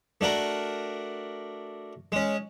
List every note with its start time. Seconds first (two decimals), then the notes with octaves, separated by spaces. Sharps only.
0.21 A3 D4 F#4 A#4
2.12 G#3 C#4